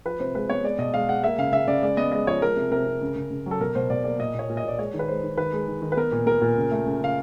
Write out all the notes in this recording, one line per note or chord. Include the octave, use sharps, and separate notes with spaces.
F3 B4
C3 C5
G#3 B4
B3 C#5
G#3 D5
B2 D#5
G#3 F5
G#3 F#5
A#3 E5
C#3 F5
C#3 E5
C#3 D5
G#3 D5
B3 D#5
G#3 D#5
F3 C#5
G#3 A#4
C3
C3 A#4
C3
C#3
C#3
C#3
F#3
A4
B2 A#4
B2 C5
B2 D5
A#3 D5
A#2 D#5
A#2 C#5
A#2
D#5
A#2 D5
G#3 C#5
D#3
B4
G#3 C5
D#3
D#3 B4
G#3
D#3
D#3
B4
B3 A#4
A#2
B3 A#4
A#2
C#3
A3
C#3
C#3 F5